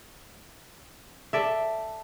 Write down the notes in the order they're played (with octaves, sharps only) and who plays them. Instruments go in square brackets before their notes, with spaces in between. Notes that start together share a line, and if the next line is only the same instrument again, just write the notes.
[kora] A4 D5 E5